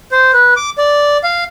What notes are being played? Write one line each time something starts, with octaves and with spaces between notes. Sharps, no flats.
C5
B4
D6
D5
F5